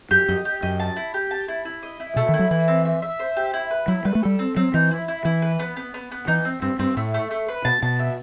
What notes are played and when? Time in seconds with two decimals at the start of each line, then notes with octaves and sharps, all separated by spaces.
0.11 F#2 G4
0.29 F#2 D#5
0.45 G4
0.62 F#2 D#5
0.80 A5
0.96 E4
1.14 G4
1.31 A5
1.48 E4
1.65 E4
1.83 D#5
2.00 E4
2.16 B2 A3
2.29 D#3
2.34 E4
2.39 F#3
2.51 E3 E4
2.68 C4
2.85 E5
3.02 E5
3.19 C5
3.37 G4
3.54 E4
3.71 B4
3.88 F#3 E4
4.05 G3 B4
4.15 A3
4.23 G3 A4
4.39 C4
4.57 F#3 C4
4.74 E3 D#4
4.91 E4
5.08 E4
5.25 E3 E4
5.42 B4
5.59 B3
5.77 B3
5.94 B3
6.12 B3
6.28 E3 D#4
6.45 C4
6.62 G2 C4
6.79 G2 C4
6.97 A2 A3
7.14 A3
7.31 A3
7.48 B4
7.65 B2 A5
7.82 B2 A5
7.99 E5